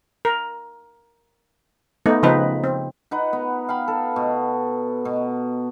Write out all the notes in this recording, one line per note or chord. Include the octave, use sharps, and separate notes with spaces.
A#4
A3 B3 D#4
C#3 F3 C4 D#4 B4
C4
D#4 B4 F#5
B3
F5 G5 B5
A4
B2
B2